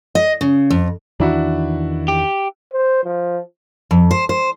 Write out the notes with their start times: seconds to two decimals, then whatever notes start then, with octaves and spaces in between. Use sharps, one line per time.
0.15 D#5
0.41 C#3
0.70 F2
1.20 E2 D#3 E3 D4 E4 F#4
2.08 G4
2.73 C5
3.04 F3
3.91 F2
4.11 C5
4.29 C5